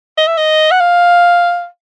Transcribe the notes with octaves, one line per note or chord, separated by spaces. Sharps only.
D#5
E5
D#5
F#5
F5